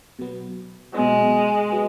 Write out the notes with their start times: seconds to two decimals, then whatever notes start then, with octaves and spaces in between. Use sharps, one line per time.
0.19 B2 F#3 B3
0.95 B1 B2 F#3 G#3 B3
1.72 F#3 B3